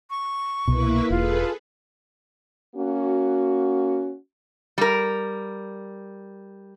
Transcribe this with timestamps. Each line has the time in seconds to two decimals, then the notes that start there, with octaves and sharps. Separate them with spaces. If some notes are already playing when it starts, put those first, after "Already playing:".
0.10 C#6
0.68 C2 B2 A#3 E4 B4
1.10 E1 F4 G#4 A4 B4
2.76 A#3 C#4 F#4
4.78 G3 A#4